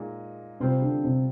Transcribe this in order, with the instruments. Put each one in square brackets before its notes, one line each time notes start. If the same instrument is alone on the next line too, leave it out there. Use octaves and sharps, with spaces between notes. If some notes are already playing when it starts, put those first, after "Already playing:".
Already playing: [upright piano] A#2 G#3 D#4
[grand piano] C3 [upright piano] G3 C4 F4 C5
[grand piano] D3
C3